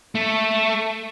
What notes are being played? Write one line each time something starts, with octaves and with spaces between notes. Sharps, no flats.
A3